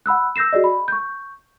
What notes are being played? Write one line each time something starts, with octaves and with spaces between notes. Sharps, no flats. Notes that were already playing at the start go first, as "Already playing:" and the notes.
F#5 B5 E6 F#6
E6 G6 A#6 C7 E7
F#4 G#4 D5 D#5
B5
C#6 G6